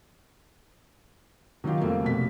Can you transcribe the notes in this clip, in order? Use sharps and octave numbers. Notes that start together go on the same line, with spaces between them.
D#3 F#3 D#4 F4 G4
F2 G3 A3 A#3
F1 B2 B6